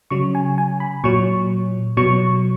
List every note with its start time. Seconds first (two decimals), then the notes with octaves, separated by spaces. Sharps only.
0.10 C#3 F#3 C#6
0.35 G#5
0.58 G#5
0.80 B5
1.04 A#2 F#3 C#6
1.97 B2 F#3 C#6